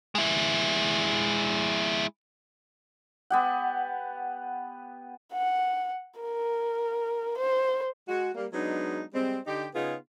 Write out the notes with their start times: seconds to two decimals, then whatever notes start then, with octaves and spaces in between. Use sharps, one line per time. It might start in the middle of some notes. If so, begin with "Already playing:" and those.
0.15 G#3 E4
3.30 B3 G4 F#5
5.33 F#5
6.20 A#4
7.37 C5
8.09 G#3 F#4
8.35 G3 A#3
8.53 F#3 G#3 B3 D4 D#4
9.14 G3 G#3 C4
9.46 D3 D#4 G4
9.75 C#3 B3 D#4 F4 G#4